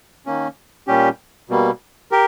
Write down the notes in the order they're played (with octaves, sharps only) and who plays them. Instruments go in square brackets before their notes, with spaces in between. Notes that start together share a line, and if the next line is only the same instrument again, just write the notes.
[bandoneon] D#3 A#3 C#4
A#2 G3 C#4 G4
B2 G3 A#3
G4 A#4